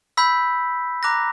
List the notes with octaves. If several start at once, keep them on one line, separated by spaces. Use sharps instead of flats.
B5 E6 G6 B6
A#5 D6 F#6 A#6